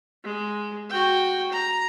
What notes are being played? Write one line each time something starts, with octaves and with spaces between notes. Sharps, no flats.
G#3
F#4 G5
A#5